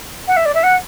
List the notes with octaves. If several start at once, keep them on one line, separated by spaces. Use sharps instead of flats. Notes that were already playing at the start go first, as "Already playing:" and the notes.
F#5
E5
D5
E5
F#5